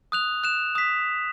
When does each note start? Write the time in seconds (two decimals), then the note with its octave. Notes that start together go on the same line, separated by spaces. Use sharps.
0.12 D#6 F#6 F7
0.44 F#6 E7
0.75 D#6 B6